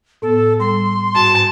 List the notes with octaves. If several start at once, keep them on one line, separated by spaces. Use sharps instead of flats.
A2 B3 A4
G3 C6
G#2 F#4 A5